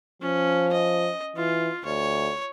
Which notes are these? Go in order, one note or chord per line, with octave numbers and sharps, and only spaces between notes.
F3 C#4
D#5
E3 F4
D2 C#5